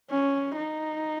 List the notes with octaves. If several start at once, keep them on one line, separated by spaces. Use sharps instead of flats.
C#4
D#4